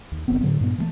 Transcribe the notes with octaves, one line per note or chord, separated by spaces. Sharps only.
D#2
F#1 D#3 B3 C4
A2 D3 F#3
G2 A#2 B3
E3 G3 A3